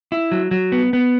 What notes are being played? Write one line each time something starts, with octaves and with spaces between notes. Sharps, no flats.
E4
F#3
F#3
B3
B3